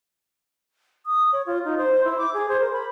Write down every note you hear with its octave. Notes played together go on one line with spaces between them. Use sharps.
D#6
C#5
F4
D#4
C5
E4
D6
G#4
C5
A#4
B5